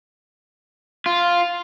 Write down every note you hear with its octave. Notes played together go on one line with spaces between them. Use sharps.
F4